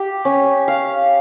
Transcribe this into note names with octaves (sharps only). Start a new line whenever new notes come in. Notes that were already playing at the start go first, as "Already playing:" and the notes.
Already playing: G4
C#4
F5